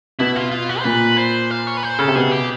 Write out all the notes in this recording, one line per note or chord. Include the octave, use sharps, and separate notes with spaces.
B2 E4
F4
F4
F#4
C5
A#2 B4
C5
F5
C#5
B4
C5
C#3 A4
C3
B2 G#4
G4